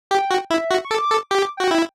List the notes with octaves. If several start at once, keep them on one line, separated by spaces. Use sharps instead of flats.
G4 G5
F#4
E4 E5
F#4
C#6
A4 D6
A4
G4 D6
F#4 G5
E4